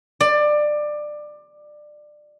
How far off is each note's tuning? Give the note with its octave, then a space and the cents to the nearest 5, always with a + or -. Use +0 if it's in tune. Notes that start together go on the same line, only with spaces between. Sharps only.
D5 +20